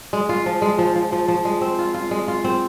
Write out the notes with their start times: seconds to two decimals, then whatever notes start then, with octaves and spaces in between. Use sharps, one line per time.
0.13 G#3
0.29 F4
0.46 F3
0.62 G#3
0.79 F3
0.96 F3
1.12 F3
1.28 F3
1.45 G#3
1.61 C4
1.79 F4
1.94 F4
2.11 G#3
2.28 F4
2.44 C4